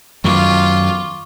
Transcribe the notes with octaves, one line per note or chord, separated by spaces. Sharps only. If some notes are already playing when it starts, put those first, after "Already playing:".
F#2 D#3 F#3 F4 C#6 D6